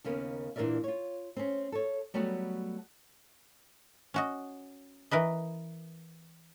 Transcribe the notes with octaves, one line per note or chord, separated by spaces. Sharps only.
D#2 C#3 A#3 B3
A#2 E3 D4 A#4 D5 E5
F4 C#5
C4 C#4
A4 C#5
F#3 G3 A3 B3 F#4
C#4 F#4 D#5
E3 A#4 B4 D#5